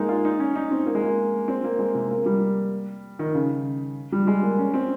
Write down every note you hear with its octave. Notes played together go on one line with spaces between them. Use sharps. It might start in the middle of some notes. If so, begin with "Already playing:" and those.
Already playing: G#3 A#3 D#4
F4
D#4
C#4
D#4
C4
A#3
G#3
A#3
C4
A#3
G#3
C3
A#3
G3
D#3
C#3
G3
G#3
A#3
C#4
C4